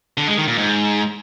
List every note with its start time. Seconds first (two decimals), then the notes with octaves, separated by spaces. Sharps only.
0.18 D3
0.28 G#3
0.38 D#3
0.48 A#2
0.58 G#2